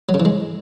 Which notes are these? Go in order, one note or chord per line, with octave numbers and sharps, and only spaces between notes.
F#3
C#3
E3
G#3